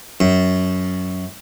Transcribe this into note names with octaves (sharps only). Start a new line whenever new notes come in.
F#2